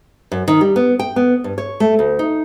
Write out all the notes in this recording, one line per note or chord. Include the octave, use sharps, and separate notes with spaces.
F#2
D#3
G3
B3
G5
B3
G2
C#5
A3
D2
D#4